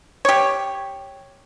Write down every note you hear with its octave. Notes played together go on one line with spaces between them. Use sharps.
G4 C#5